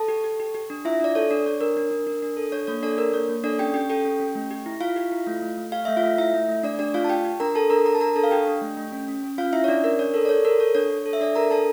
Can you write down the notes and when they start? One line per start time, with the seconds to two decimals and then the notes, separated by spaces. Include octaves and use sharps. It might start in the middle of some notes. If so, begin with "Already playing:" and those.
Already playing: A4 A5
0.08 G4
0.24 G4
0.40 G4
0.55 G4
0.70 D4
0.85 E4 F4 E5
1.00 D4 D5
1.15 A4 C#5
1.31 D4 D5
1.46 D4 C#5
1.61 D4 A#4
1.77 D4
1.91 D4
2.07 D4
2.22 D4
2.37 A4
2.52 D4 C#5
2.67 A#3 C#5
2.83 D4 A4 D5
2.98 D4 A#4
3.13 A#3 C#5
3.29 A#3
3.44 D4 A4 D5
3.59 C#4 G4 G5
3.74 C#4 G4 G5
3.90 G4 A4 G5
4.05 C#4
4.20 C#4
4.35 A3
4.51 G4
4.66 E4
4.81 E4 F4 F5
4.96 G4
5.12 E4
5.27 A3
5.42 A3
5.57 A3
5.72 G4 F5
5.85 A3 E5
5.97 F4 F5
6.03 A3
6.18 A3 E4 E5
6.34 A3
6.49 A3
6.63 A3 D4 D5
6.79 D4 G4 D5
6.94 A3 F4 F5
7.04 A5
7.09 G4 G5
7.25 G4
7.40 D4 A#4 A#5
7.55 G4 A4 A5
7.70 D4 A#4 A#5
7.85 G4 A#4 A#5
7.95 A5
8.00 D4 A#4 A#5
8.16 D4 A4 A5
8.24 F5
8.31 D4 G4 G5
8.47 D4
8.61 A3
8.77 A3
8.92 C#4
9.08 C#4
9.23 C#4
9.38 C#4 F4 F5
9.53 E4 E5
9.64 C#5
9.68 C#4 D4 D5
9.84 D4 A#4
9.99 D4 C#5
10.14 A4 A#4
10.25 D5
10.29 A4 C#5
10.45 A4 A#4
10.60 A4 C#5
10.75 D4 C#5
10.90 D4
11.06 A4
11.13 E5
11.21 D4 A4 D5
11.36 A4 A#4 A#5
11.51 D4 A4 A5